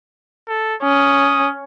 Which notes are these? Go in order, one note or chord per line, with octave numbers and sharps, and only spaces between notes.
A4
C#4 D#6